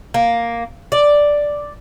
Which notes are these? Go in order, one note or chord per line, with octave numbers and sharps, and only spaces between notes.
A#3
D5